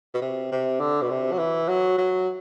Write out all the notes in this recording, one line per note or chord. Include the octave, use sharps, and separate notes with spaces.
B2
C3
C3
D3
B2
C3
F#3
E3
F#3
F#3